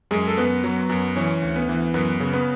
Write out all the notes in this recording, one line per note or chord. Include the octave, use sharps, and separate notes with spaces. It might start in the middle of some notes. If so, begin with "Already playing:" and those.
F#2 G#3 G#4
A4
F#2 B3 B4
F#3
F#2
E3 C#4 C#5
D2
B3 B4
E3
F#2 B3 B4
C#3
B3 B4